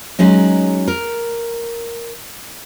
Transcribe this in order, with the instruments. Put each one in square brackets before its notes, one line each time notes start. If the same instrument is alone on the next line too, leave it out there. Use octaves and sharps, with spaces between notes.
[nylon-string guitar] F#3 G#3 C#4 D#4
A#4